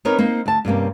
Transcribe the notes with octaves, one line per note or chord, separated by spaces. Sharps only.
B3 C4 D#4 A#4 B4 C#5
A#3 C4 D#4
D2 A5
G2 C3 A#3 C#4